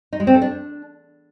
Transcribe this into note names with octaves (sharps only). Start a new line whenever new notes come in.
D#4
G#3
C4
A4
D4